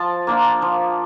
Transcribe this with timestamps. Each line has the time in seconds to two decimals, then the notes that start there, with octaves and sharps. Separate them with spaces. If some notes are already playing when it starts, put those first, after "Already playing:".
Already playing: F3 A5
0.27 A#3 D4 F4
0.62 F3